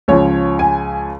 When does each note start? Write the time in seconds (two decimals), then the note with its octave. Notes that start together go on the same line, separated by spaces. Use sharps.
0.08 C#2 C#3 F3 C#5
0.59 G#5